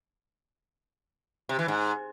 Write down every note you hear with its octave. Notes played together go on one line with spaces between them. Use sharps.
C3
E3
G#2